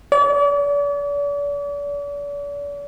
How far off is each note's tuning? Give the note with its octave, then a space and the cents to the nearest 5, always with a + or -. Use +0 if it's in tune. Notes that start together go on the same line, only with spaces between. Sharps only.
D5 -40